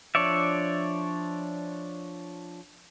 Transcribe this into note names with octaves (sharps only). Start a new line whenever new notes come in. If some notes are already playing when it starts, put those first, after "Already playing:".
F3 D4 C#5 D5 E5